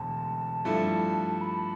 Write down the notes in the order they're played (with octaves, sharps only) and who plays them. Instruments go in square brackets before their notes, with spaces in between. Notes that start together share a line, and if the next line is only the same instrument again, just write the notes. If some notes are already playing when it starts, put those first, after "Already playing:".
Already playing: [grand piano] E1 D2 [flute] A5
[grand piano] G2 F3 A3 E4
[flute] B5